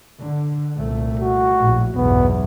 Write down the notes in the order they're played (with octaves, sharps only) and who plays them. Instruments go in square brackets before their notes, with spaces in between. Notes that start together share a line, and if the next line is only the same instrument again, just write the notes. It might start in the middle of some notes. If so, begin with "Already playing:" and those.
[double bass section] D3
C2 A#2 A3
[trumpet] F#4
[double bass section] A#1 A2
[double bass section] B1 E2 G2 [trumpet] B3